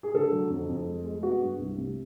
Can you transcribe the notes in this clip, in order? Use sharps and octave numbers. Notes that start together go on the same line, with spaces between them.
G#4
D3 A4
F#3
F2
F2
G#3
G#3
B3 F#4
G2
C2
C3